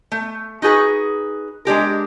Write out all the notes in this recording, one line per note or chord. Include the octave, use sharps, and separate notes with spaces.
A3
D#4 F#4 G#4 B4
G#3 D4 G4 A#4